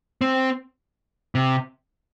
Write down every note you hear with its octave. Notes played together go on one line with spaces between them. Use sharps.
C4
C3